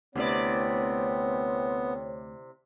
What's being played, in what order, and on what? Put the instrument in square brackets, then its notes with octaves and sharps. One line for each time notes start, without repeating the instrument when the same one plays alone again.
[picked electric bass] D2 [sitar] C3 E4 D5 [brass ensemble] A3 C4 C#5 [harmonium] B3